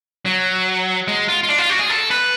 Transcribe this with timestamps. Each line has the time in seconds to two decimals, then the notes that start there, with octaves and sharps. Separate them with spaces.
0.26 F#3
1.08 G#3
1.28 F4
1.43 F4
1.49 D4
1.59 F4
1.70 F#4
1.79 G#4
1.90 A4
2.11 B4